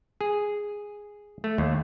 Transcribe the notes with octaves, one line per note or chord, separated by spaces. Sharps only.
G#4
A3
D#2